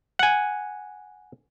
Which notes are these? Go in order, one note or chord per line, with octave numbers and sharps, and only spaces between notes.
F#5 G#5